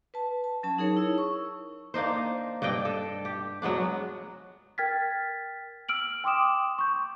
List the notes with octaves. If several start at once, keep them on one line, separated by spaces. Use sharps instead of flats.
B4 A5
A5
F#3 C#4 A5
D#4 G#4 A#4 C#5
E4 E6
C#6
A#3 D4 D#4 C5
G2 D4 D#5 G5
A4
G4
F#3 G#3 B3 D4
A#4 G5 F6 G#6 A6 B6
E6 F6 D7 F#7
G5 C6 D6 D#6 E7
C#6 G6